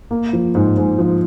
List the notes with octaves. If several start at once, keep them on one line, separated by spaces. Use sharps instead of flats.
A#3
F3
G#2
G#2
F3